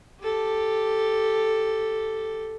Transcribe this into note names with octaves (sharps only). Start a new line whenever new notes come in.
G4 A4